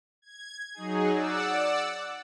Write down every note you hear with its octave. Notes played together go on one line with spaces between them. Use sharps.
G#6
F#3 D#4 G#4
D5 F#5 E6